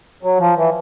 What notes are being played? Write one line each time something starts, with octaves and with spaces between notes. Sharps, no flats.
F#3
F3
E3